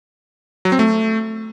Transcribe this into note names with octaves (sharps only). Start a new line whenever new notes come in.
F#3
C4
A3